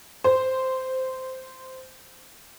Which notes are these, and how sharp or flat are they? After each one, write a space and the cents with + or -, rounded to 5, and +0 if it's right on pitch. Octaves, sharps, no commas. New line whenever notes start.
C5 -10